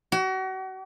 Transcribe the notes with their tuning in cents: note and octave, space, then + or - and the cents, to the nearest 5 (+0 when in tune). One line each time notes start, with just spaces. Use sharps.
F#4 +35